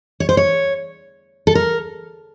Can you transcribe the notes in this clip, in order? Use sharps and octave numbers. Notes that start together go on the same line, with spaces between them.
C#5
C5
C#5
A4
A#4